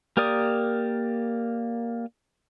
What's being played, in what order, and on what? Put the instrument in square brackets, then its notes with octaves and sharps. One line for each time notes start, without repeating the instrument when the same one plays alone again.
[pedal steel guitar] A#3 G4 A#4 D5 D#6